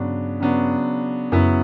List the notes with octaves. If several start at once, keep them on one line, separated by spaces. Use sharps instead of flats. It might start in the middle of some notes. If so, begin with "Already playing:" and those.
Already playing: G2 C#3 F#3 B3 D4
C#3 F#3 B3 D4
F#2 C#3 F#3 B3 E4